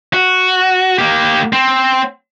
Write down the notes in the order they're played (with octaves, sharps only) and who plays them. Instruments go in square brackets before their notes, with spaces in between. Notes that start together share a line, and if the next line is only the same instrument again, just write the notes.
[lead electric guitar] F#4
A#3 G4
C4